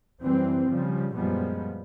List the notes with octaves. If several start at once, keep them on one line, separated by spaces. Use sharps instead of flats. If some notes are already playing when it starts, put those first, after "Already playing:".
F#2 E3 G3 C4
C#3 F3 G3
F#2 A#2 F3 G3 G#3 B3